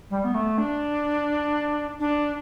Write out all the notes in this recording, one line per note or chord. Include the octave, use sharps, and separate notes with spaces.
G3
B3
A3
D4
D4